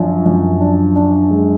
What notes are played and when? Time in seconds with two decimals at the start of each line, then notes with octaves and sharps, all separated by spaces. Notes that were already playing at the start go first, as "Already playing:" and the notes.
Already playing: F#2 F3 D4
0.26 F#2
0.61 D4
0.96 D4
1.31 G#3